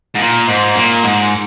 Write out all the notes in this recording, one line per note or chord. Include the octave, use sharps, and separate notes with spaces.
G#2
A#2
G#2
A#2
G#2